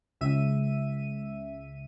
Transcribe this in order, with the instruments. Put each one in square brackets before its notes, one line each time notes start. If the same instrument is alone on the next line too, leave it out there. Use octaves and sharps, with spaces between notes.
[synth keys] C#2 E5 D#7